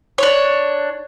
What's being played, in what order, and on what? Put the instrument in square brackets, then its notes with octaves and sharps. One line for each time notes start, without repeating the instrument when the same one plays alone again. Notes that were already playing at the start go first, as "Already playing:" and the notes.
[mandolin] D4 C#5